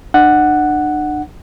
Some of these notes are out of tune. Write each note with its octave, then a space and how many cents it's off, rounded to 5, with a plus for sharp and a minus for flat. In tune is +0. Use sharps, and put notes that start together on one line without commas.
D4 +40 F#5 +0